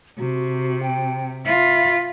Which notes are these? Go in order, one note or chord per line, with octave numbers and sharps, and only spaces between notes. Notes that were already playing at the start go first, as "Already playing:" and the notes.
C3 F#4
G5
F4 E5 B5